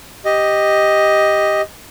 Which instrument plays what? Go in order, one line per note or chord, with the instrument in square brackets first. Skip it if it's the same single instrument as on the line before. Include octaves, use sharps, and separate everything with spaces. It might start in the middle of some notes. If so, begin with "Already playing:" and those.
[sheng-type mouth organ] G4 D#5